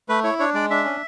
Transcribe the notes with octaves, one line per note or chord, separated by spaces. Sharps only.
A3 B4
E4 C#5
D4 C#5
G#3 D5
D4 E5
C#4